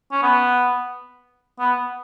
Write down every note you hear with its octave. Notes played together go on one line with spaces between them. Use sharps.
C#4
B3
B3